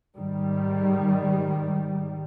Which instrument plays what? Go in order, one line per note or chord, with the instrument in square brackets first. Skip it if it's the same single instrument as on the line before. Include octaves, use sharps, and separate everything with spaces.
[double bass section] G#2 D#3 G3